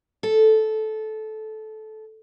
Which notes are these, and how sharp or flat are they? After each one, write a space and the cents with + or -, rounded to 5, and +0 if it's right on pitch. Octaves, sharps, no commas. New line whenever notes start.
A4 -15